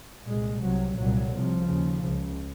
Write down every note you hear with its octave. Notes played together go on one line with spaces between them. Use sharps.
C2 A#2 G#3
C2 C3 F#3
C2 A#2 F#3
C2 C3 F3
D#2 C#3
C#2 C#3